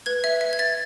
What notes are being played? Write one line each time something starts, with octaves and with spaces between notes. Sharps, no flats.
B4 G#6
E5
E5
G#6
E5 A6